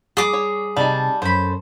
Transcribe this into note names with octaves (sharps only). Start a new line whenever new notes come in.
G3 G#4 D6
C#5
C3 G3 D#4 A5
F#2 A4 C5 C#5 B5